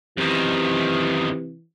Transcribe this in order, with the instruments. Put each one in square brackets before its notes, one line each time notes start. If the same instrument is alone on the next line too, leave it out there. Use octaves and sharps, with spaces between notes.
[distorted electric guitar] F#2 D#3 [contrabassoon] C3 [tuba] E3